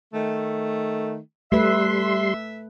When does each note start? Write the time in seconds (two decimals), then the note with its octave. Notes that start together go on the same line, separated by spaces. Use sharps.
0.14 D#3 A3
1.52 G3 A3 B4 E5 C6